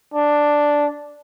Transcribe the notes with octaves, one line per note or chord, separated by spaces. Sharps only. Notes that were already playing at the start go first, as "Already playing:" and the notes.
D4